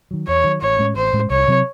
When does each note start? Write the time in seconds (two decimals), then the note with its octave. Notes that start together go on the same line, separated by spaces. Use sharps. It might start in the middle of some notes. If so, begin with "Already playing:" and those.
0.11 D#3 F#3
0.28 E2 C#5
0.44 D#3 F#3
0.62 A1 C#5
0.78 A2 G#3 C#4
0.96 A1 C5
1.13 A2 G#3 C#4
1.30 C2 C#5
1.48 C3 F#3 C4